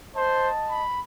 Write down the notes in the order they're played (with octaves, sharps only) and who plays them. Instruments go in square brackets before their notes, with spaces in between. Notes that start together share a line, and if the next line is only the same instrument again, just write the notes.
[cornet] C5 [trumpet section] D#5 A5
[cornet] B5